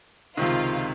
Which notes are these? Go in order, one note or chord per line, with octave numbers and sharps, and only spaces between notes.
C#2 C3 D#3 F4